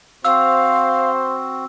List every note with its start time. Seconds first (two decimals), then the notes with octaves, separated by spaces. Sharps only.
0.25 C4 F#4 C5 F5 E6